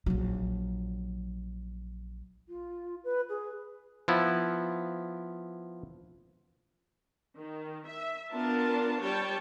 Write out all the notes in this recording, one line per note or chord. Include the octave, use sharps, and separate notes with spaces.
A#1 F#3
F4
B4
G#4
F3 B3 E4
D#3
E5
B3 D4 F4 A#4 A5
G3 C#5 G5 A5